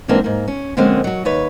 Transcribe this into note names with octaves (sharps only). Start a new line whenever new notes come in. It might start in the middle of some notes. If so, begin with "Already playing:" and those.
G#2 E3 G#3 A#3 C4 D4
G#2 A#3
C#4
D3 F3 G#3 A#3 C4 C#4
F#3 F#4
D#2 B4 C#5